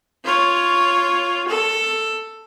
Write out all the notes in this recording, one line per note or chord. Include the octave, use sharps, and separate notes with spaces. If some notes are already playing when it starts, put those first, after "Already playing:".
F4 C#5
A4